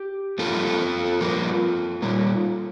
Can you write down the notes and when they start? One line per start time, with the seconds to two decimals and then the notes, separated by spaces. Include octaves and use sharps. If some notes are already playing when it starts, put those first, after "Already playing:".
Already playing: G4
0.38 G2 F3 A#3 F4 A4
1.21 G2 F3 A#3
2.02 A#2 G3 A#3